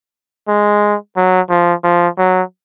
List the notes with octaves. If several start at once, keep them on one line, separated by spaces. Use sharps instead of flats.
G#3
F#3
F3
F3
F#3